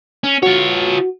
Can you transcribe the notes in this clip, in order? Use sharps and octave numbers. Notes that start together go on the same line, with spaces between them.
C#4
F4 F#4 C#5